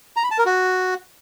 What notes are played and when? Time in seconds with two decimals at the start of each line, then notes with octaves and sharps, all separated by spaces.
0.16 A#5
0.24 B5
0.31 A5
0.38 A#4
0.46 F#4